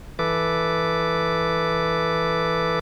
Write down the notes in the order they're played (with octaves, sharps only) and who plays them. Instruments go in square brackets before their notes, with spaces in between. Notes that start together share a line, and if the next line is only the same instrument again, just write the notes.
[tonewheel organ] E3 A4 B4 D6